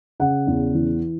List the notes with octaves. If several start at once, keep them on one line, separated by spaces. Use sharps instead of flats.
C#3 F#5
E2
E3